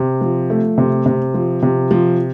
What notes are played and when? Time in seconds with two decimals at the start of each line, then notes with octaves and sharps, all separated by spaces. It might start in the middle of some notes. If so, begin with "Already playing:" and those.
Already playing: C3
0.21 F3
0.50 A3
0.78 C3
1.06 C3
1.34 F3
1.62 C3
1.91 F3